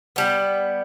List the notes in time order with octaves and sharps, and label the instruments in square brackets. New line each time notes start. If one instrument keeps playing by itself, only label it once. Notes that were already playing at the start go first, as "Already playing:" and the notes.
[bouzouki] G3 B3